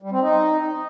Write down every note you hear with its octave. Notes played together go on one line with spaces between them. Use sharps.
G3
C4
D#4